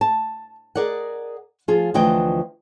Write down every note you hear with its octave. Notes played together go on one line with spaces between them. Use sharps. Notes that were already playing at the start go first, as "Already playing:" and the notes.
A5
G#4 A#4 D5 D#5 F#5
F3 F4 G#4
D2 E3 F3 D#5 G5